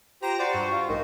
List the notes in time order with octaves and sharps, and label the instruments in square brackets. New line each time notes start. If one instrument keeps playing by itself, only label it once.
[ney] F4 [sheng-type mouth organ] G4 C5 [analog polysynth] A#5
[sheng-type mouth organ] F#4 C5 [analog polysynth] D5
[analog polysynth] G2 [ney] C#6
[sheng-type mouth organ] F4
[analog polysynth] A1 [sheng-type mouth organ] D#4 [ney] A#4